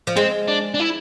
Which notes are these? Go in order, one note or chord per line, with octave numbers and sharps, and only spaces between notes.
F3
G#3 C4
D4
D4
E4